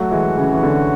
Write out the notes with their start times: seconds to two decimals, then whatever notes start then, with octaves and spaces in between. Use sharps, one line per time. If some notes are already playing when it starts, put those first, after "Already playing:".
Already playing: F#3 A3 F#4 C#5 F#5
0.11 E3 G#3
0.37 C#3 E3
0.53 E3
0.63 D3